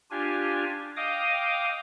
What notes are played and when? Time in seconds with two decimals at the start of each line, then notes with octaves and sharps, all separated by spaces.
0.11 D4 F4 G4 G#5
0.96 D#5 F5 G5 D6 D#6